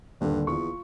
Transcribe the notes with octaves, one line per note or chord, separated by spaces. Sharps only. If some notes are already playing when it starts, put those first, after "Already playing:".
D#1 G2 D3
E2 F4 C#6